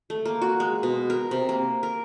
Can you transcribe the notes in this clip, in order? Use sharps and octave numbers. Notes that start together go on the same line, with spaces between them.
A3
A#3
F#4
G#3
B2
A#4
C3
A#3
A#4